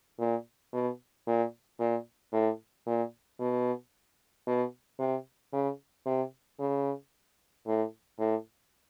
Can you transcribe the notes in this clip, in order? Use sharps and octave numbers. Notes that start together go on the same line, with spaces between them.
A#2
B2
A#2
A#2
A2
A#2
B2
B2
C3
C#3
C3
C#3
A2
A2